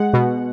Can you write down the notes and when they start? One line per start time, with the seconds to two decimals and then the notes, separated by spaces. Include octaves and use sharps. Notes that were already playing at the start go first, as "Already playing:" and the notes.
Already playing: G#3 F#5
0.13 B2